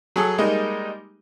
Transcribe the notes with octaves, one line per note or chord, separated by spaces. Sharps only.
F#3 G#4 A4
G3 G#3 A#3 D#4